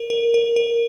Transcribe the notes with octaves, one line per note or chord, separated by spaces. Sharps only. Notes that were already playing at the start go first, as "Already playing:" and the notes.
Already playing: A#4
A#4
A#4
A#4